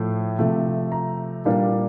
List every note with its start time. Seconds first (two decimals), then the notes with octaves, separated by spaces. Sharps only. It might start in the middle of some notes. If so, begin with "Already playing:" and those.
Already playing: A2 F3 A3
0.39 C3 F3 A3
0.92 A#5
1.45 A#2 G3 A#3 D4